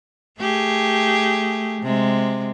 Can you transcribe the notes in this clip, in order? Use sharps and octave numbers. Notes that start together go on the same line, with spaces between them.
A3 G4 G#4
C3 G#3